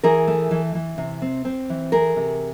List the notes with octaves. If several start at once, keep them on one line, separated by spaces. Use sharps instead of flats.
E3 G#4 A#4
A3
E3
E3
C3
C4
C4
E3
A3 G#4 A#4
C3